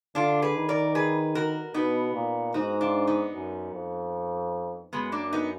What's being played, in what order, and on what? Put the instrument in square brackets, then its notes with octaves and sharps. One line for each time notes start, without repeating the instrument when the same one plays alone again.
[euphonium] D3 [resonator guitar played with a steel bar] D4 F4
[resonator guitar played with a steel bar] G#4 B4
[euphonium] D#3
[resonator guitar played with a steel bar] A#4 D5
G#4 B4
F#4 A#4
[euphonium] B2 [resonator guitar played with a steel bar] B3 D#4
[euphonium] A#2
[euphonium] G#2 [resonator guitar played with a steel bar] D#4 F#4
[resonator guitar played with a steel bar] D4 F4
B3 D#4
[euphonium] F#2
F2
[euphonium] F#2 [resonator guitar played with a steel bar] G#3 B3
[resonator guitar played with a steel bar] A#3 D4
B3 D#4